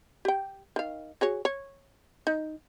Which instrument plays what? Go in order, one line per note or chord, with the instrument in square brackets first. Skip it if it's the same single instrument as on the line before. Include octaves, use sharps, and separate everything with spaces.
[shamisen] G4 G5
D#3 F5
F#4 G#4 C#5
C#5
D#4